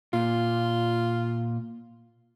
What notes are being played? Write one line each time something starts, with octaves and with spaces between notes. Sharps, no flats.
A#2 F4